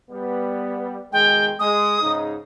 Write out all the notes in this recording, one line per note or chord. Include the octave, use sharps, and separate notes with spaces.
G3 B3
B2 D#3 G#3 G5
G#3 D#6
G#2 C#3 D#4